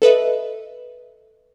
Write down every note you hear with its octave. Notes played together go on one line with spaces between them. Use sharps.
A4 B4 D#5 E5